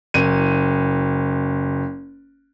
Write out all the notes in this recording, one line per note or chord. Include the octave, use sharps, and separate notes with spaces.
F#1 D#7